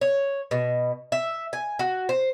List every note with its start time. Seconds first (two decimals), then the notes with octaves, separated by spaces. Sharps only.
0.01 C#5
0.51 B2
1.12 E5
1.53 G#5
1.79 F#4
2.09 C5